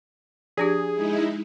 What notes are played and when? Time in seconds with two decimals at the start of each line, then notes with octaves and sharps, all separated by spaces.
0.57 F3 D4 G4 G#4
0.92 G#3 D#4 E4